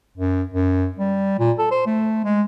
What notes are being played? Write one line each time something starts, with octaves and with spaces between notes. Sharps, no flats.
F#2
F#2
G3
A#2
A4
C5
A3
G#3